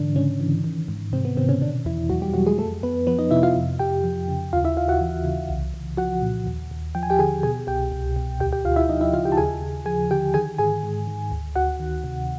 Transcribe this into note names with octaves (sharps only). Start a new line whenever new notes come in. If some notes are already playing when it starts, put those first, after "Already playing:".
Already playing: G#2 D3 E3 D4
G#2 C#3 C#4
E3
D#3
G#2
G#2 C3 C4
B3
C3 D#3 C4
C#3 C#4
B2 D3 D4
E2 E3 E4
E2 F#3 F#4
G3 G4
B2 F#3 F#4
G#3 G#4
F2 A3 A4
F2 B3 B4
F3 B3 B4
D#4 D#5
C3 E4 E5
F4 F5
F2
F2 G4 G5
F3
C#3
D#2 F4 F5
E4 E5
D#2 F4 F5
F#4 F#5
E3
C#3
C2
C2
F3 F#4 F#5
A#2
D#2
D#2
F3 G5
G#5
G4 G5
D3 G#4 G#5
B2 G#4 G#5
C2 G4 G5
C2
B2
D2 G4 G5
G4 G5
D2 F4 F5
E4 E5
F3 D#4 D#5
E4 E5
C#3 F4 F5
G4 G5
A5
D#2 G#4 G#5
D#2
F3 G#4 G#5
D3 G4 G5
D#3 G#4 G#5
G#2 G#4 G#5
G#2
D#3
D2
D2 F#4 F#5
D#3
C3